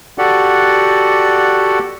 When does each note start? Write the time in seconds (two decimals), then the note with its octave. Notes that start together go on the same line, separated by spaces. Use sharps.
0.18 F#4 G4 A4 D5 F#5